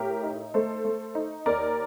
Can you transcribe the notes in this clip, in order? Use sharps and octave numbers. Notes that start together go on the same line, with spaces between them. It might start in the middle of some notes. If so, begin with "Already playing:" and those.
Already playing: A2 G4 A#4
D#4
A3 A4 C5
A3
D#4
D#2 A#4 D5